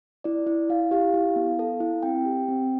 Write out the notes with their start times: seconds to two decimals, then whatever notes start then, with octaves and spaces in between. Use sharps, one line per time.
0.24 E4 D5
0.47 E4
0.69 E4 F5
0.91 G4 F5
1.14 E4
1.36 B3
1.59 A4
1.80 E4
2.03 C4 G5
2.25 G4
2.48 C4